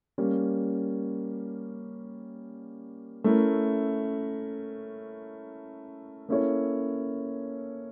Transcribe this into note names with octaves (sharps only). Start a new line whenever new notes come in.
G3 A#3 C#4
A3 C#4 E4 A#4
A#3 C#4 E4 A4 C#5